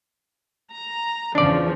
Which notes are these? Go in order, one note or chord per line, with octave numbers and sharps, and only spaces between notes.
A#5
E2 C#3 F3 D4 D5